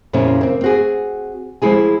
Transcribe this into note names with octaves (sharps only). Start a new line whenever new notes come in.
F2 A#2 C#3 A#3 C#4 E4
A#3 C4
C4 F#4 G#4
F3 G#3 E4 G#4 G#5